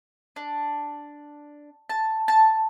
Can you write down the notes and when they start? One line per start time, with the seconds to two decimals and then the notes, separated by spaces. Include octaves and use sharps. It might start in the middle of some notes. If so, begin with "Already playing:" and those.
0.36 D4
1.90 A5
2.28 A5